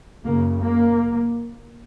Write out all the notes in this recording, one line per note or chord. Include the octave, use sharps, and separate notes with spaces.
F#2 C#3 A#3
A#3